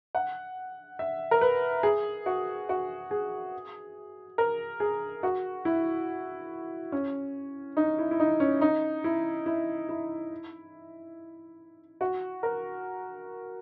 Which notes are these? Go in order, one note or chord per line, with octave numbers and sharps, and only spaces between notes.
F#5
E5
A#4
B4
G#4
F#4
F#4
G#4
A#4
G#4
F#4
E4
C#4
D#4
E4
E4
D#4
C#4
D#4
E4
E4
E4
F#4
A#4